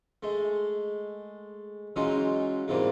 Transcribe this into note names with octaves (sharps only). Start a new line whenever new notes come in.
G#3 A3
E3 F#3 G#3 C#4 D#4 F4
E2 G#2 C3 E3 G3 A#3